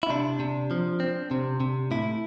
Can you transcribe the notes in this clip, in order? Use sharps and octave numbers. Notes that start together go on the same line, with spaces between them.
E4
C3 D4
C3
F3
C4
C3
C3
A2 E4